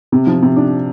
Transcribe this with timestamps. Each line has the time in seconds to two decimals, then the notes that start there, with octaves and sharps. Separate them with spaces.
0.12 C3
0.27 F3
0.42 C3
0.56 D4